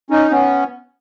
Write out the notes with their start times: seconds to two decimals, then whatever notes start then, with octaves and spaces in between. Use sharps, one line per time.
0.10 C#4 D#4
0.31 B3 C#4